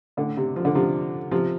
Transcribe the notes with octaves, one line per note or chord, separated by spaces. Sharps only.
A2 D3
C3
F3
D3
C3 F3
C3 F3